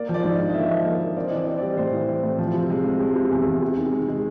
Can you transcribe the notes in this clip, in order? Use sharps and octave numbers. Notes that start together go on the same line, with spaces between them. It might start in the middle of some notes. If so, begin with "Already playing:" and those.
Already playing: A#3 D5
F3
D5
G#2
D#5
D4
D#5
A#3 E5
F3
A#3 D#5
A#3
C4 D5
E3 D#5
D5
C4
G3 D5
A2 C5
E3
C4
A2
F3
C3
G#3
C3
G#3
C3
E2
E2
C3
D#3
G#3
G#3